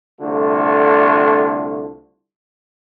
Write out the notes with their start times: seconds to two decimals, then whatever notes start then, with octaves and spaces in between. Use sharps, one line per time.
0.20 C2 D3 A3 F4